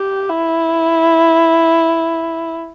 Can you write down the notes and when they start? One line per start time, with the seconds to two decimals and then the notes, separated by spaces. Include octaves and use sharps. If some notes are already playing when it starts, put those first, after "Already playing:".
Already playing: G4
0.29 E4